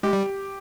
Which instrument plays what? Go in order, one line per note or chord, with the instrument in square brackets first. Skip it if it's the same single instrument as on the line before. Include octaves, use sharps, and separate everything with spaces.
[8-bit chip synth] G#3 [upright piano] G4
[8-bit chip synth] G3